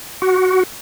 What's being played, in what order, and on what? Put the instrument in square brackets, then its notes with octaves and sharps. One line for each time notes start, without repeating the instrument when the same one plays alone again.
[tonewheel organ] F#4